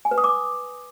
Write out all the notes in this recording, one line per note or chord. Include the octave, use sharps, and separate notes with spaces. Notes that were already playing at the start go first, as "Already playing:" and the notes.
G#5
B4
D#6
D6